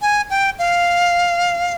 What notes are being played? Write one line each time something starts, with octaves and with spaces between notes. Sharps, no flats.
G#5
G5
F5